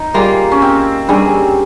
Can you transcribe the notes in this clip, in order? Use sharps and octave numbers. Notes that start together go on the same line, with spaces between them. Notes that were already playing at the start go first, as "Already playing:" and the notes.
Already playing: D#4
G3 A#3 F4 G#4
C#4
C4
G2 G3 C#4 G#4